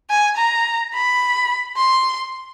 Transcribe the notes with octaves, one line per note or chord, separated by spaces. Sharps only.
G#5
A#5
B5
C6